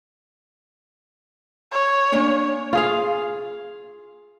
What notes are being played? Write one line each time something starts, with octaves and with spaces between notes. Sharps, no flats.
C#5
A#3 C#4 D4
F4 G#4 F5